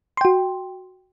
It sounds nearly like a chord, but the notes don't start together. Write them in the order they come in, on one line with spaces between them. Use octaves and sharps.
C6 G5 F#4